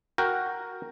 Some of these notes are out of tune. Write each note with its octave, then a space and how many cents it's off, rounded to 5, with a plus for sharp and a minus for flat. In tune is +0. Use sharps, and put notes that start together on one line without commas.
F#4 +0 A#4 +0 G5 +0